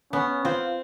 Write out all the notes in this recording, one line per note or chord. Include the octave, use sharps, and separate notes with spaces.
B3 C#4
C4 F4